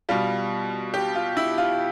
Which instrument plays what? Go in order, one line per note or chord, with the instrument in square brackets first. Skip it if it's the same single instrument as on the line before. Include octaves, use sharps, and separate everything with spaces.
[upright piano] B2 G3 F4
G4
F4
E4
F4